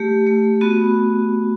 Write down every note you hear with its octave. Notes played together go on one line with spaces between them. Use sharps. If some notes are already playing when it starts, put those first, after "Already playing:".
Already playing: A3 G4
A3
B3 F#4